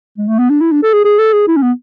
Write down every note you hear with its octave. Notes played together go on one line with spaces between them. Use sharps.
G#3
A3
B3
D4
E4
D4
A4
G#4
G#4
A4
G#4
E4
C#4
B3